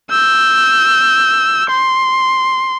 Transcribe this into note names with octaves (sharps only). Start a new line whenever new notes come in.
E6 G6
C6